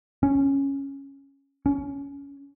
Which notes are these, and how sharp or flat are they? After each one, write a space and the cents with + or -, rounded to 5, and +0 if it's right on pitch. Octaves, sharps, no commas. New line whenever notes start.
C#4 -5
C#4 +20